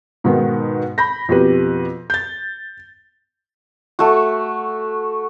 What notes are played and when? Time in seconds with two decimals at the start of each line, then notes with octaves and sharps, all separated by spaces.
0.24 G#2 B2 D#3 B3
0.98 B5 G6 A#6
1.29 F2 B2 G4 B4
2.10 G6 A6
3.99 A3 F#4